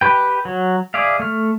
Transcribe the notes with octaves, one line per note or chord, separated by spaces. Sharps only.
G4 B4 G5
F#3
G#4 D5 E5 F5
A3 F6